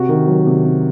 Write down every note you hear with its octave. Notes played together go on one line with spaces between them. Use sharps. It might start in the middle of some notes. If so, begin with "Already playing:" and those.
Already playing: C3 F#4
D#3
F#3
C3
C3